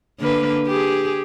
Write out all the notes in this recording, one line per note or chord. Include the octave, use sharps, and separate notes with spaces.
D3 A#3 B4
G4 G#4